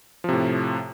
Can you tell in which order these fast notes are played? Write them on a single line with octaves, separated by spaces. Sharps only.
F3 C3 A2